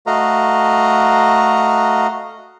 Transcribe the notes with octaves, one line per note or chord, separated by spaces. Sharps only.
A3 F#4 D#5 F5 A#5